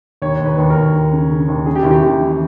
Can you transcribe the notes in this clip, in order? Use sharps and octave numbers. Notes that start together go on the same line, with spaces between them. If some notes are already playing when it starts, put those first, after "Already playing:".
D#2 C#5
D#2
B4
D#2
A#4
D#2
D#2
C#3
C#3
D#2
C#3 G#4
G4
D#2 E4
G4
D#2 G4
E3